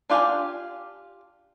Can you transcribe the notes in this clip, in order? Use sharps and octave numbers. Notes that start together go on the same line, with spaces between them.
D4 F4 G4 F5 G#5